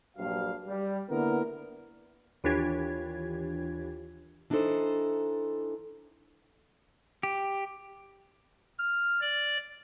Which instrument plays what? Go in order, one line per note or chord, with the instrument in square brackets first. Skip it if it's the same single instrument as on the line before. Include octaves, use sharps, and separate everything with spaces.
[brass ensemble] A#1 G2 F#3 F5
G3
D3 A#3 B3 E4 A#4
[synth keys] D#2 E3 D4 F4 G4 G#6
[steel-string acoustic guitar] E3 D4 D#4 F#4 A4 C5
[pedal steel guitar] G4
[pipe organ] F6
D5